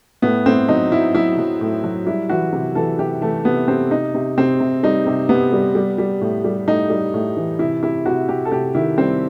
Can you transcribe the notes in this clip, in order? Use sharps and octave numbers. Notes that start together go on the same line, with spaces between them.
A2 B3
A2 C4
F#3 D#4
F#3 E4
F#3 E4
F#3
A2
F#3
G3 E4
E3 F#4
C3
E3 A4
C3 G4
E3 A3
C3 B3
C3 C4
C3 D#4
C3
C3 C4
C3
G3 D#4
C3
C3 B3
G3
G3
G3
A2
G3
A2 D#4
G3
A2
E3
C3 E4
C3 E4
C3 F#4
C3 G4
A4
C3 G4
D#3 E4
G3 C4